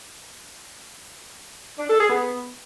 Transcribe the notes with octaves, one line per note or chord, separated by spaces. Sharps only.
D4
A4
G#4
B3